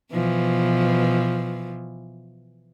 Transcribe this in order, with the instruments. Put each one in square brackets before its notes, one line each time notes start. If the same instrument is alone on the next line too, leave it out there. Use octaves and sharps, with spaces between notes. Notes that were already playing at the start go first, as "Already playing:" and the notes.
[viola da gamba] B2 E3 F3